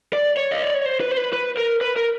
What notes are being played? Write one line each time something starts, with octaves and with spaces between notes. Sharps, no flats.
D5
C#5
D#5
D5
C#5
C5
B4
C5
B4
B4
A#4
B4
A#4